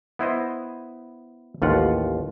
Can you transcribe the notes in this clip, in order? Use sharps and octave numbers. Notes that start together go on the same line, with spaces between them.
B3 E4 C5 D#5
A1 D#2 F4 F#5